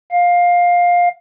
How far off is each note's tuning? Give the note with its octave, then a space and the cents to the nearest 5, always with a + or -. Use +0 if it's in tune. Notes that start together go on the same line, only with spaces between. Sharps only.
F5 +15